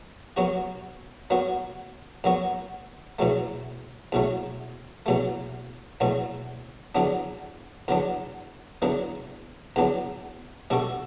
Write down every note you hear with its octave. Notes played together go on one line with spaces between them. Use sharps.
F#2 F#3 B3 F#4
F#2 F#3 B3 F#4
F#2 F#3 B3 F#4
E2 B2 F#3 A3
E2 B2 F#3 A3
E2 B2 F#3 A3
E2 B2 F#3 A3
E2 D3 F#3 B3 D4
E2 D3 F#3 B3 D4
E2 D3 F#3 B3 D4
E2 D3 F#3 B3 D4
B2 G3 D4 F#4 A4